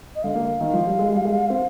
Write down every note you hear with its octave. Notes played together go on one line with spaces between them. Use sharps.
D#5
D3 F5
A#3
D#3
F3
G3
G#3
G3
G#3
C4